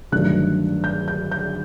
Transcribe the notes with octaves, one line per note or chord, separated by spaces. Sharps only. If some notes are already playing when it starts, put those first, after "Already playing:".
G1 G2 D#3 F#3 A3 F#6
G6
G6
G6